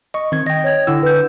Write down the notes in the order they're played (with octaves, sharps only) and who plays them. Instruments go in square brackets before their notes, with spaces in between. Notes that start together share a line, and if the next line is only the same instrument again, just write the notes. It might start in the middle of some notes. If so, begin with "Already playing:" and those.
[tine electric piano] D#5 C#6
D#3 C4 G#6
[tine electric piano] D#5 G5 [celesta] A#6
[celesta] C#5 G#6
[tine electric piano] D3 F#5 E6 [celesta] E4
[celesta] B4 G6